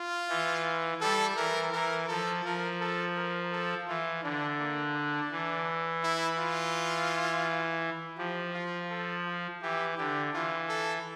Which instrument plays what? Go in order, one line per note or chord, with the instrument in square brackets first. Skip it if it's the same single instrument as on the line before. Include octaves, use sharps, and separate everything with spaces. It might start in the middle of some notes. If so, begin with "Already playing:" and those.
Already playing: [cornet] F4
[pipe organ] E3
[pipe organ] G3 [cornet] A4
[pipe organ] E3 [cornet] A#4
[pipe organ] E3 [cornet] A#4
[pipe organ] F3 [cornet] A4
[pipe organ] F3 [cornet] A#4
[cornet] A4
A#4
A4
[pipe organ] E3 [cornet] F4
[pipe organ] D3 [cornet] D4
[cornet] A#3
D4
[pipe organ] E3
[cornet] E4
F4
[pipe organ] F3 [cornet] G4
[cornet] F4
A4
F4
[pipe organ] E3 [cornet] G4
[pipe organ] D3 [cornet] G4
[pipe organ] E3 [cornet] F4
[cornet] A4